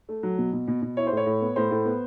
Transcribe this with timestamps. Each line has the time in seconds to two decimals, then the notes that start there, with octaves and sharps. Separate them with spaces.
0.09 A3
0.23 F#3
0.38 B2
0.53 B2
0.68 B2
0.82 B2
0.97 E4 C#5
1.07 C5
1.12 A2
1.17 C#5
1.26 A2
1.41 B3
1.56 A2 C5
1.71 A2
1.85 B3